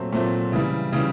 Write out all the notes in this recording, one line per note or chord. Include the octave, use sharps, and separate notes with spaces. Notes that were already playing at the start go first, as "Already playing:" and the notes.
Already playing: A#2 F#3 A3 C4
A#2 F#3 A3 C4
C#3 E3 G3
C#3 E3 G3